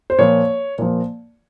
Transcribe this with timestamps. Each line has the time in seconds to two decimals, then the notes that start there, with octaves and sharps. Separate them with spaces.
0.10 C5
0.19 A#2 F3 C#5
0.78 A#2 F3